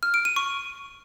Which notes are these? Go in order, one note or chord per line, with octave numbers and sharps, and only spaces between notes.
F6
D7
D#7
C#6